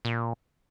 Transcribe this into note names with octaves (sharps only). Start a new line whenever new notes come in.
A#2